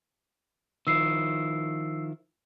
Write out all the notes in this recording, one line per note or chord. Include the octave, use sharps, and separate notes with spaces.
D#3 F3 E4 E6 C7